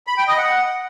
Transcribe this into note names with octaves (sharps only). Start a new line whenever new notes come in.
B5
G5
D#5
F#5